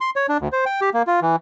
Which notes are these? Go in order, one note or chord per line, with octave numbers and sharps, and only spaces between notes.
C6
C#5
D4
D2
C5
G5
G4
A#3
F4
E3